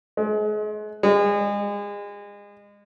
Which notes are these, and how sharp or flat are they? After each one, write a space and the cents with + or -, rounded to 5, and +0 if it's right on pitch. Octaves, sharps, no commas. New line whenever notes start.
G#3 +35
G#3 -30